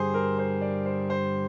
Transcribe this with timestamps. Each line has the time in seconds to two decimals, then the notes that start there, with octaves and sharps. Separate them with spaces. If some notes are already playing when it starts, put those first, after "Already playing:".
Already playing: G2 D3 G3 G#4 C5
0.14 A#4
0.39 C5
0.61 D5
0.86 C5
1.10 C5